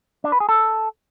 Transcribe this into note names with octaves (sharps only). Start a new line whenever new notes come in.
D4
B4
G#4
A4